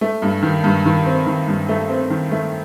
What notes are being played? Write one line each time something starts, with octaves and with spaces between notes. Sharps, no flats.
A3
G2
D#3
G2
D#3
C4
D#3
G2
A3
C4
D#3
A3